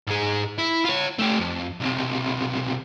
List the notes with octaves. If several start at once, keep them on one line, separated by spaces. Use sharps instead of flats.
G#2 G#4
E4
F4 C#5
A3 G4
F2
B1 C3